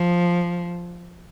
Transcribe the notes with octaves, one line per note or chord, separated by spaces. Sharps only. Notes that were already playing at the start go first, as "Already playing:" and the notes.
Already playing: F3